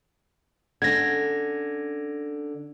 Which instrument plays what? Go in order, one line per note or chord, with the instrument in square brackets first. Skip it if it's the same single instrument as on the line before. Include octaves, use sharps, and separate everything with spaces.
[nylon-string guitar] D3 C#4 [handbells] G#6 A#6